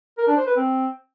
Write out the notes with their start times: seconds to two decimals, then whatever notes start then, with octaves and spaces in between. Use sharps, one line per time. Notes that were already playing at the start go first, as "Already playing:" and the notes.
0.18 A#4
0.27 D4
0.37 C5
0.47 B4
0.56 C4